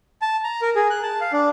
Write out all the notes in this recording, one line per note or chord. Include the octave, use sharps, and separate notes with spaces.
A5
A#5
A#4
G#4
F#6
A5
F5
D4